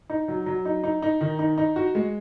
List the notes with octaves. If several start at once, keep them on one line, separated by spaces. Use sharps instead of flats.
D#4
F#3
F#3
D#4
D#4
D#4
D#3
D#4
D#4
F#4
G#3